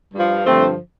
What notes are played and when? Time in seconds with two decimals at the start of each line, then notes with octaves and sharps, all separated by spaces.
0.14 G2 F3
0.46 G2 D3 F3 A3 C4